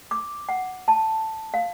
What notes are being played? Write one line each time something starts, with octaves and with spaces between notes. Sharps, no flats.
D6
F#5
A5
F5